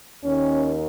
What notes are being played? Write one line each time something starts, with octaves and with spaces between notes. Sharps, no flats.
D#2 D#3 C#4